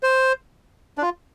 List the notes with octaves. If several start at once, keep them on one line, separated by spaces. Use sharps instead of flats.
C5
D4
F4